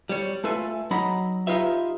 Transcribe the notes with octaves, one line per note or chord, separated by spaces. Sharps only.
G3 C#5
A3 F4 A4 B4 E5 G#5
F#3 D#4 A#5 B5
D#4 F4 G4 B4 E5